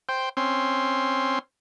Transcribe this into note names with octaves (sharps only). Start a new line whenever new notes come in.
C5 G5
C4 C#4 C6